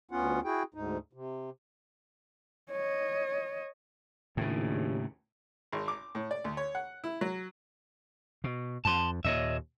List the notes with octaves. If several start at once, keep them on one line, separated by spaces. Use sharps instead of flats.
D2 B3 C#4 F4 F#5
E4 F#4 G#4 G5
D2 G#2 D#4
C3
C#5 D#5
A#1 D#2 A2 C#3
G#1
D6
A2
D5
D2
C#5
F#5
E4
F#3
B2
F2 A5 C6
D#2 A#2 C#5 D#5 E5